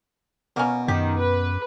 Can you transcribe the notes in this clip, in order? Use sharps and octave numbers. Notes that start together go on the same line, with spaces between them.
B2 A#3 C#4
F#2 D#3 G4
B4